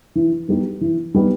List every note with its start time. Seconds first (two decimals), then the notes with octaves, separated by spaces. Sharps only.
0.15 E3
0.48 G3 B3 D#4 G4
0.81 E3
1.14 G3 B3 D#4 G4